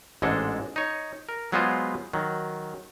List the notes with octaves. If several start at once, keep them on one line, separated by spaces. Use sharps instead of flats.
A1 G#2 G#3 D4 A4
D#4 C#5
A#4
F#3 G#3 B3 F4 G#4 C5
D#3 F#3